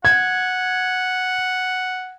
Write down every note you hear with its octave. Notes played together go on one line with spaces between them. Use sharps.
F#5 G#6